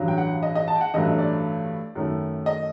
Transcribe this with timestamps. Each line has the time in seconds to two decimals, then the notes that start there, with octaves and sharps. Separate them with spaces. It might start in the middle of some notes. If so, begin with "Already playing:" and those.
Already playing: A1 G2 F#3
0.08 G5
0.18 F#5
0.43 D#5
0.55 D#5
0.68 A5
0.76 G5
0.81 F#5
0.94 A1 G2 F#3 A3 D#5
1.18 D5
1.95 F#2 D#3 A3
2.46 D#5